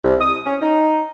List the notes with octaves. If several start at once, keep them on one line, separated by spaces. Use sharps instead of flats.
C2
D#6
C#4
D#4